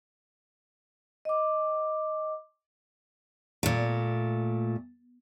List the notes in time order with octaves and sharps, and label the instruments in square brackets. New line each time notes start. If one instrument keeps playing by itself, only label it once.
[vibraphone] D#5 D6
[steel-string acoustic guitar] A#2 A3